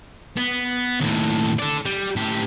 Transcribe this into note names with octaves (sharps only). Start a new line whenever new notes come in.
B3
D#2 A2
A4 D5
G3
A2 G4